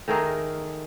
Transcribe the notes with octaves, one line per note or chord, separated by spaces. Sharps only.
D#3 A3 G#4 A#4